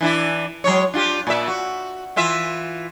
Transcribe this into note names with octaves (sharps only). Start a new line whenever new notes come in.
E3 D4 E4
F#3 G#3 C#5
D4 F4 G4
A#2 D5 E5
F#4
E3 F4 E5